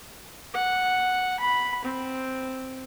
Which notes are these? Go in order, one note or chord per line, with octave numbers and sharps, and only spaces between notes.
F#5
B5
C4